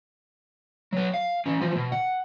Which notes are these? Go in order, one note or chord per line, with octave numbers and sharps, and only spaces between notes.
F#3 B3
F5
E3 C#4
E3 F3
B2
F#5